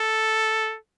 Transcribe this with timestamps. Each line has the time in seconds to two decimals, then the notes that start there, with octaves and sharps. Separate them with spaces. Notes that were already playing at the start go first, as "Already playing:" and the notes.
Already playing: A4